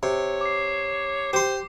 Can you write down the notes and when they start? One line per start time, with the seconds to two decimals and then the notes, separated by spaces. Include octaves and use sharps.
0.03 C3 C#5
0.41 D6 C7
1.33 G4 C5 C6